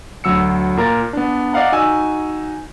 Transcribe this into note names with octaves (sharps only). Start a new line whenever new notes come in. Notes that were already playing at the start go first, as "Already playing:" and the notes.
D2 F#3 E6 C#7
A#2 A#4 A#5 A6
B3 D4
D5 D#5 F5 F#5 A#5
D#4 F#4 G#5 E6